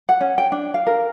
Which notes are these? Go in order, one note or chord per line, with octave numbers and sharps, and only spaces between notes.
F#5
C#4
G5
D4
F5
A#4